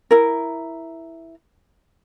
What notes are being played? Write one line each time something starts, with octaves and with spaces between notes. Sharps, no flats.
E4 A#4